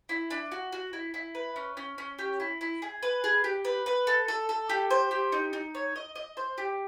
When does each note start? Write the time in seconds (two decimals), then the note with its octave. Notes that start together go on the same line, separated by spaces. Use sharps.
0.09 E4
0.31 D4
0.52 F#4
0.72 F#4
0.93 E4
1.14 E4
1.35 B4
1.56 C#4
1.77 C#4
1.98 C#4
2.19 G4
2.40 E4
2.61 E4
2.82 G#4
3.03 B4
3.24 G#4
3.44 G4
3.65 B4
3.86 B4
4.07 A4
4.28 A4
4.49 A4
4.69 G4
4.91 C5
5.11 G4
5.32 D#4
5.53 D#4
5.75 C#5
5.96 D#5
6.15 D#5
6.37 C5
6.58 G4